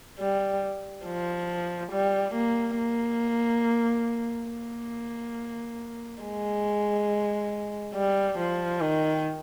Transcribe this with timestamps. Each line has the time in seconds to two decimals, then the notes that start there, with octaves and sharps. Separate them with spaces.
0.20 G3
1.05 F3
1.92 G3
2.34 A#3
2.78 A#3
4.50 A#3
6.23 G#3
7.94 G3
8.38 F3
8.81 D#3